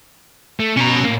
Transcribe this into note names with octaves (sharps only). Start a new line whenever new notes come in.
A3
B2 C#4 A#5
A2 A#3